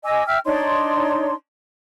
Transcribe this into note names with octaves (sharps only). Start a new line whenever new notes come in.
D#5 G#5 D6 E6
E5 G5 E6 F6
D4 D#4 C#5 C6